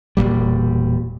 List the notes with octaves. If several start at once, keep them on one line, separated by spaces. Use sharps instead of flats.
E1 C2 A#2 G3